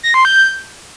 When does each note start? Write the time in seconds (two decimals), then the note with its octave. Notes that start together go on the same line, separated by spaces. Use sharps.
0.03 A#6
0.14 C6
0.25 G6